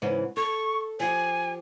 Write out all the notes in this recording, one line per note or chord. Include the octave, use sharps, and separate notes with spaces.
G#2 C#3 E3
A4 C#6
F3 G4 G#5